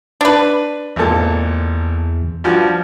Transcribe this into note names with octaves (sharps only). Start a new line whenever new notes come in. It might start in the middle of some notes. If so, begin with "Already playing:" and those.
D4 B4
G#1 E2 A#2 A4
G2 F3 F#4